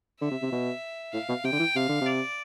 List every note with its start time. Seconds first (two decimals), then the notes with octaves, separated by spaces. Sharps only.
0.21 D3 E5
0.31 C3
0.42 C3
0.52 B2
1.13 A2 F5
1.29 B2
1.44 C3 G5
1.52 D3
1.59 E3
1.76 C3 F5
1.89 D3
2.01 C3
2.07 D5